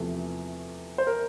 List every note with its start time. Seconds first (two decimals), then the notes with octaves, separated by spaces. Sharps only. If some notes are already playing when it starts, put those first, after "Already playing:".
Already playing: E2 C3 F3 A3
0.98 C5
1.07 A#4